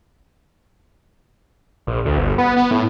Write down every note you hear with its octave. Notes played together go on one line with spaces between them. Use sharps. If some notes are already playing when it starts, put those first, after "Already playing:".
A#1
D2
G1
B3
B3
A2